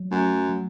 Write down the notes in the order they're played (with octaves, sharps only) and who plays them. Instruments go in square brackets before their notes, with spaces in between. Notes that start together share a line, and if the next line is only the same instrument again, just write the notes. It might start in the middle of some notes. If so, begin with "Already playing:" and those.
Already playing: [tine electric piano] F#3
[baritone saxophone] F#2 [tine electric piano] A3
[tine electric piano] F#3